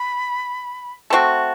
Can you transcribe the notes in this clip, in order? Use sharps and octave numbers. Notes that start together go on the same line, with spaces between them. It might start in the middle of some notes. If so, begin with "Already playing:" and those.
Already playing: B5
A3 C4 F#4 A5